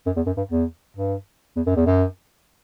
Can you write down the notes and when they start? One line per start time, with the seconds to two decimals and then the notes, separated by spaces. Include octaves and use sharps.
0.06 F#2
0.16 E2
0.26 F#2
0.37 G2
0.51 E2
0.96 G2
1.56 E2
1.66 F#2
1.76 E2
1.86 F#2